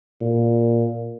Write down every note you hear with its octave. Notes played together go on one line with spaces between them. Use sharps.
A#2